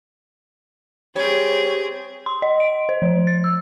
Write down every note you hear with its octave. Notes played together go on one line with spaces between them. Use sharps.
G3 C4 G#4 C#5
C6
D#5
D7
C5
F3
A6
E6